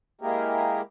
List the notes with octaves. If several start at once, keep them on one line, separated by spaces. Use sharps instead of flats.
G#3 A#3 E4 G4 G#4 A#4